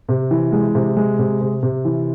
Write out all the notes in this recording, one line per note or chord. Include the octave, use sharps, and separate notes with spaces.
C3
E3
G#3
C3
G#3
C3
C3
C3
E3